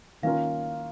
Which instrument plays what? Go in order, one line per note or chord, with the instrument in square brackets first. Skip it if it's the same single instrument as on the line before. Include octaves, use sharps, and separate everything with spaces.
[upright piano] D#3 A#3 C#4 F4 A#4 [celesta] F5